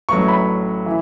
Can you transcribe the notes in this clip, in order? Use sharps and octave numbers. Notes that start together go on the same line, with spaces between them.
A1 A2 F#3 C#6
B5
E3